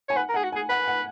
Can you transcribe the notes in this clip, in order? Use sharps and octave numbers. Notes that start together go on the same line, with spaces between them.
C#5 G#5
B4 F#5
A#4
G#4 F#5
F#4
G#4 G#5
B4 F#5
F#5